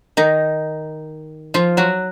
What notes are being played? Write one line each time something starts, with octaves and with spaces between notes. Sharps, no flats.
D#3 D#4
F3 F4
F#3 F#4